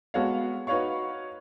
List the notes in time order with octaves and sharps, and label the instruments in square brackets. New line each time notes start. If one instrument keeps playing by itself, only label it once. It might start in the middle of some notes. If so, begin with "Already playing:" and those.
[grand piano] G#3 B3 F#4 A4 C#5 F5
D#4 F#4 B4 C#5 F5 C#6